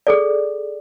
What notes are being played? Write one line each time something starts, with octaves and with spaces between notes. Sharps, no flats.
G#4 A4 D5